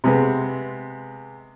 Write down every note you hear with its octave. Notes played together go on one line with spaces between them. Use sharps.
C3 G#3 B3